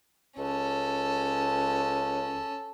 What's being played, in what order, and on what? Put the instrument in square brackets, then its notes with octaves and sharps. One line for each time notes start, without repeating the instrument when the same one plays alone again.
[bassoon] C#2 [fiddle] C#4 A4